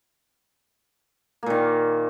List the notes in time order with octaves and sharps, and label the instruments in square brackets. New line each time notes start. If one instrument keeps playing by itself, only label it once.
[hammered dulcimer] A#3
A#2
D#3